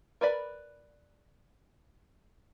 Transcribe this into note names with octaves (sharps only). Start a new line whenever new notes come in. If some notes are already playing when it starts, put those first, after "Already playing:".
A#4 B4 D5 B5